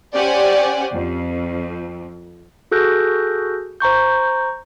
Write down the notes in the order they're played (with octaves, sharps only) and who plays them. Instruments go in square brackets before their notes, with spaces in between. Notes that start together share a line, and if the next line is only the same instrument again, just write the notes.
[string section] C#4 G4 C5 D5 F#5 G#5
F2
[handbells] F#4 G#4 A4 F#6 G6 A#6
C5 A#5 C#6 G6